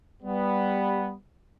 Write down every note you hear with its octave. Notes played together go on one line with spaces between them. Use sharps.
G3 B3